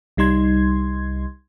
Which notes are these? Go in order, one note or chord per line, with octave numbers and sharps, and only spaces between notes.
C2 G3 D#4 C6 G#6